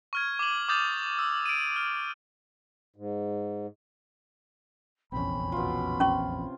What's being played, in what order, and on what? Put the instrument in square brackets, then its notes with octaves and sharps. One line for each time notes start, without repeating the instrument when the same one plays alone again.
[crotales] C#6 F6 G#6
D6 F#7
D6 D#6 G6 A6 F7
E6
D7 D#7
F6
[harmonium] G#2
[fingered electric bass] F1 A#1 E2 [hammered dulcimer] C4 C#4 [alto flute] B5
[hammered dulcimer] B2 F4
[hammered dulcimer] C3 [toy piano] C#4 C6 C#6